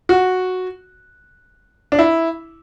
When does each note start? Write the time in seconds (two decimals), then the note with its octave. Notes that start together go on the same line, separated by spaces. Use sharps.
0.09 F#4
1.92 D4
1.99 E4